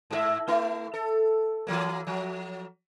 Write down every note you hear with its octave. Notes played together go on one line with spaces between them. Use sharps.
G#2 F#4 E5
A3 E4
A4
E3 F#3 A#3
F3 F#3